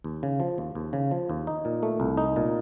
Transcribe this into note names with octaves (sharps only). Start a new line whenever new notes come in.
D#2
C#3
F3
D#2
D#2
C#3
F3
D#2
D#4
A#2
A3
C2
D#4
A#2